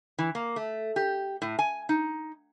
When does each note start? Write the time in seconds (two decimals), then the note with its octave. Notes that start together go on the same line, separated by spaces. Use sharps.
0.18 E3
0.35 A#3
0.56 A3
0.96 G4
1.42 A2
1.59 G#5
1.89 D#4